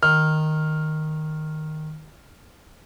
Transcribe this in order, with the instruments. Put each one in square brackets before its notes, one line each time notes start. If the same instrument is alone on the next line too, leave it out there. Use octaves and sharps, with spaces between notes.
[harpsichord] D#3 [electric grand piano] F6